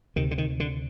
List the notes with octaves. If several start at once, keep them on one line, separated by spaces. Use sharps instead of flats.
D2 C3 D#3
D3
D#3
D3